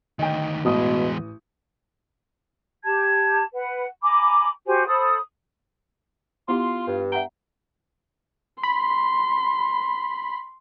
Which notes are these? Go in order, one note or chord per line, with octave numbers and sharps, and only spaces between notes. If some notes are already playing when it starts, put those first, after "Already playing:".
D2 D#3 D#5 G5
A1 E2 B2 G#3 D#6
G4 A5 G#6
B4 F#5
G#5 A#5 B5 D6
F#4 G4 C5 G#5
A4 C5 B5 D#6
B3 E4 F4 G4 C6
G2
E5 F#5 G5 A#5
B5 C6